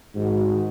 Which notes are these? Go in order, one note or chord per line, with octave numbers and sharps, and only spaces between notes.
G#2 D#3 G#3 D#4 F#4